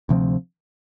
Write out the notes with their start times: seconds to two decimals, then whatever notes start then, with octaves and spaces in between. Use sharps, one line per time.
0.09 D2 C3 F3 C4